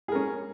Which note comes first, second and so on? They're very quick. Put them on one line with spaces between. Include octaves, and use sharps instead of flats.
G#4 A#4 C#4